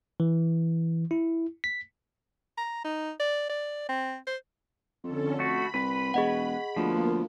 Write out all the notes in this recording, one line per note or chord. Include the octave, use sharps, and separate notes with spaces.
E3
E4
B6
A#5
D#4
D5
D5
C4
C5
F2 D3 C#4 A4
A3 F#4 B5
C2 B4
E1 G#4 D#5 F#5
D2 F3 A#3 B3